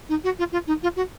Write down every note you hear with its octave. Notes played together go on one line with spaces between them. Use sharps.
D#4
F#4
F4
F4
D#4
F4
F#4